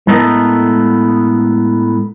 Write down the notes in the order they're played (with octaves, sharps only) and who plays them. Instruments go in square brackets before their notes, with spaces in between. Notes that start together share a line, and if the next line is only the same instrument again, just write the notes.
[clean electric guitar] A2 G#3 B3 A4 A#4 D#5